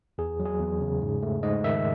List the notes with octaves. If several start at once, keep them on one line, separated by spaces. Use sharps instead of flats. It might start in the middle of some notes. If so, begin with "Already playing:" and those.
E2 G#4
F#3
G#4
E2
C#3
G#2
A3
G#2 D#5
D#3 E5